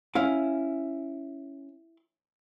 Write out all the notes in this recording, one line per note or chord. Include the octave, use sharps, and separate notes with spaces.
C#4 E4 F5